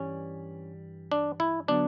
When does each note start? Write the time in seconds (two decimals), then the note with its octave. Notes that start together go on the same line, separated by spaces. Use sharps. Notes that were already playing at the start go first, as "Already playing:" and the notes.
Already playing: G2 E3 G3 C#4
1.12 D4
1.40 E4
1.68 D3 F#3 B3 D4